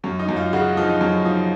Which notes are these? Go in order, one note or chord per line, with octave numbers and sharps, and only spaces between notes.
F#2 C#4
D#4
F#2
F4
C#3 F#4
F3 D#4
D#4
F#2 C#4
F3 D#4